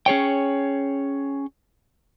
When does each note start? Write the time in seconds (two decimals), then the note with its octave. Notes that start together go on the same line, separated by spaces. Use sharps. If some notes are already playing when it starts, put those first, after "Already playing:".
0.06 C#4 G#4 C#5 G5